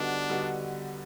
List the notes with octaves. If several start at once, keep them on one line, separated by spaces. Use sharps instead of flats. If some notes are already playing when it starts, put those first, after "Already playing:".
Already playing: D3 G3 B3 D4 D#4 F#4
D3 G3 B3 D#4 F#4